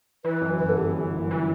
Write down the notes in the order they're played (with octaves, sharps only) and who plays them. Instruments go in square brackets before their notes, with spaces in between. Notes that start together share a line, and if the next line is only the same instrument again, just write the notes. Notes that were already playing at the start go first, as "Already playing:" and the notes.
[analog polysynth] E3 [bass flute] B4
[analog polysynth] F#2
[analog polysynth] G1 [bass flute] B4
[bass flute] A4
[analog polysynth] G1 [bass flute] G4
[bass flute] A4
[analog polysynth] F#2
G1
E3